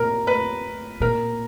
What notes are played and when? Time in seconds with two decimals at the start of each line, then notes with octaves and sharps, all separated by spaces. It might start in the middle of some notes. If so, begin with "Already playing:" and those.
Already playing: A#2 A#4
0.27 B4
1.00 A#2 A#4